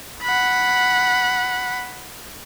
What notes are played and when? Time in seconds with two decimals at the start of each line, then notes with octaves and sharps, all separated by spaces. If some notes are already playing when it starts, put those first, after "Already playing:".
0.23 F#5 B5